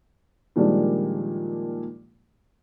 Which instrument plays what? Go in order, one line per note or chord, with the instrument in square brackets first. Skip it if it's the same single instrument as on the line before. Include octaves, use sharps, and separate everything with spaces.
[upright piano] A#2 D#3 F3 G3 G#3 D4